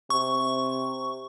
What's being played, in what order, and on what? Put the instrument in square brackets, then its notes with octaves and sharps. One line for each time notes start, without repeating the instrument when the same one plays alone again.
[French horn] C3 [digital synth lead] C#6